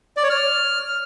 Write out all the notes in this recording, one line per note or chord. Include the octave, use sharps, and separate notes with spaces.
D5
C#5
F6